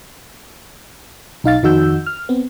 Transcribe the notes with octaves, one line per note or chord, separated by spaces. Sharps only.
B1 D#4 F5 A6
F2 D#3 D#4 F#4 E6 G6
F6
B3 C4